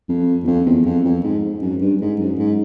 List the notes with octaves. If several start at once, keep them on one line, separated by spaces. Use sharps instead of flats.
F2
E2
F2
E2
F2
F2
G#2
F#2
G2
G#2
F#2
G#2